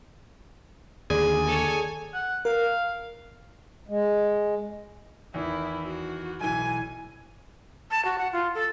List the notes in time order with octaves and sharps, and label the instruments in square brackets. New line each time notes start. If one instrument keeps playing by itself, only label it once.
[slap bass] D#2 D3 [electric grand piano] G#4 D5 [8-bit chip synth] G#5
[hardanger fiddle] A4 C#5
[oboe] F#5
[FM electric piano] A#4 [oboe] F5
[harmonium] G#3
[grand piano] E2 D#3 [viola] E4
[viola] F#4
[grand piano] B1 E3 [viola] G#5
[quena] A5
F#4
F#5
F4
A4